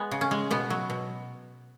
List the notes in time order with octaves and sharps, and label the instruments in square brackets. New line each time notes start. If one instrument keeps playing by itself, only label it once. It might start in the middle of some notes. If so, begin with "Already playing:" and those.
Already playing: [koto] G#3 B3
C#3
C#4
G#3
B2 B3
F#3
B2